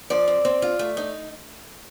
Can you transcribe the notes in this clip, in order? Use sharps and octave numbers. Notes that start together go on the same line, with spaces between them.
F3 D5
C4
C4
F4
A3
D#4